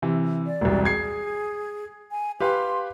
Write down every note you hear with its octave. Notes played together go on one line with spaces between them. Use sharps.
C3 E3
D5
E1 C2
G#4 G#6 C7
G#5
G4 B4 F5 C6